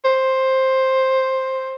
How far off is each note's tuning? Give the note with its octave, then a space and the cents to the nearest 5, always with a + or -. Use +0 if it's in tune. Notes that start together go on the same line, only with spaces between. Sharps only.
C5 +10